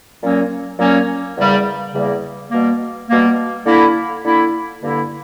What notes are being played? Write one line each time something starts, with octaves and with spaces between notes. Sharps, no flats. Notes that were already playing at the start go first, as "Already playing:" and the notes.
A#2 F#3 A#3 C#4
A#2 F#3 A#3 C#4
E2 C#3 G3 A#3
E2 C#3 G3 A#3
B2 G3 A#3
B2 G3 A#3
D3 A#3 E4
D3 A#3 E4
G2 D3 A#3 E4